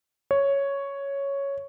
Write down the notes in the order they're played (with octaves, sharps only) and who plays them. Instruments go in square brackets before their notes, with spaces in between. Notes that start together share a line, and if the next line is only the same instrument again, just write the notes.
[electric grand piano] C#5